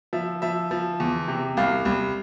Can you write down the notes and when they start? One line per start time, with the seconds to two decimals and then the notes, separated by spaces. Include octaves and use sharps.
0.13 F3 E5
0.42 F3 E5
0.71 F3
1.00 E2
1.28 C3
1.57 C2 F5
1.85 C2